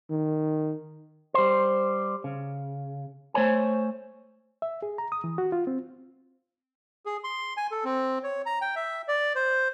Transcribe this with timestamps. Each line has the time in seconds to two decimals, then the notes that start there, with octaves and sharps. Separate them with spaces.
0.10 D#3
1.34 G3 C5
2.24 C#3
3.34 A3 C5 C#5 G#5
4.62 E5
4.82 G#4
4.98 A#5
5.12 D#6
5.24 E3
5.38 F#4
5.52 F4
5.67 C4
7.06 G#4
7.24 C6
7.57 G#5
7.72 A4
7.85 C4
8.23 C#5
8.46 A#5
8.61 G5
8.76 E5
9.08 D5
9.35 C5